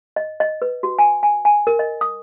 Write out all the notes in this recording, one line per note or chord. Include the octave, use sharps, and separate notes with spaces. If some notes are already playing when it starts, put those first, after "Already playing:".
D#5
D#5
B4
F#4
G#5
G#5
G#5
A#4
D#5
D#6